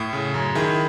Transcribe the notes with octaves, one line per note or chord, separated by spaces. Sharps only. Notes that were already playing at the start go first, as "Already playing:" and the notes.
Already playing: A2
C#3
F#2
D#3 E4 G#4